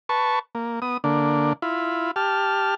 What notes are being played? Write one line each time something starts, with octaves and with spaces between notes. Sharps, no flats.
B4 A5 C#6
A#3
B3 D#6
D3 A#3 D4
E4 F4 B5
G4 A5 F6